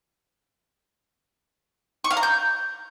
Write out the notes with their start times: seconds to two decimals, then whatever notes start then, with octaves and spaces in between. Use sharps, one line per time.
2.04 C#6
2.11 F5
2.17 A#5
2.23 G6